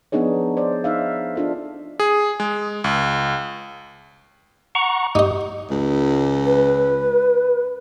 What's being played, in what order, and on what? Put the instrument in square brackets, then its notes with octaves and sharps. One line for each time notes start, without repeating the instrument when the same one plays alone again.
[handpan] F3 B3 D4 D#4 G#4 C#5
C5 D5
D#4 E5 F5
D4 F4 A4
[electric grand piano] G#4
G#3
C#2
[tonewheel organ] F#5 A#5 C#6
[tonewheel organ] G2 G4 [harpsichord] D#4 D#5
[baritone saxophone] C#2
[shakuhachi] B4